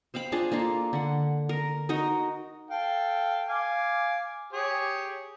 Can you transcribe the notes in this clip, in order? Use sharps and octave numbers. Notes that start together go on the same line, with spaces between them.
C5 F5 G5 B5
D4 F4 G#4 A5
A#3 D4 F4 A4
D3 F#5
A#4
D#4 F#4 A#4 D#5
A4 F5 G5
F5 G#5 D6
G4 G#4 C#5